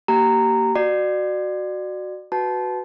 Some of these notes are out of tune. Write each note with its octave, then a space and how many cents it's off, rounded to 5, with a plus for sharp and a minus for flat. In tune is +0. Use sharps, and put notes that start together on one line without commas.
A#3 +0 G4 -25 A#5 -15
F#4 +0 D5 +30
F#4 +0 B4 +0 A5 -20